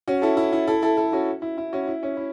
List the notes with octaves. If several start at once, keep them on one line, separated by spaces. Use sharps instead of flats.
C#4 F#4
E4 A4
E4
E4
E4 A4
E4 A4
E4 A4
C#4 F#4
E4
E4
C#4 F#4
E4
C#4
E4